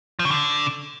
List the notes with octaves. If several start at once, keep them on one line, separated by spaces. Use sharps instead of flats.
F3
C#3
D3